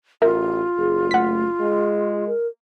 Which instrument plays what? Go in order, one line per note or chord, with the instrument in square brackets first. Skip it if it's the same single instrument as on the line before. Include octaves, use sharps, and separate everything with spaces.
[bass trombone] A1 [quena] F4 [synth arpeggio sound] A#4 E5
[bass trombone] F#1 [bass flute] G#4
[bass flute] A3 [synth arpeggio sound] F#5 B6
[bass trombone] G#3 [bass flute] G#4
[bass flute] A#4